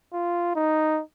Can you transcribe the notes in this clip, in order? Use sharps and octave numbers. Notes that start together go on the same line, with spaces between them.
F4
D#4